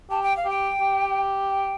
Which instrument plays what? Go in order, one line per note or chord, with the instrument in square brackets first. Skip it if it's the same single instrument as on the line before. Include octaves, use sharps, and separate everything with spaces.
[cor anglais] G4 [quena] A5
[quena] G5
F5
[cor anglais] G4 [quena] G5
[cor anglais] G4
[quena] G5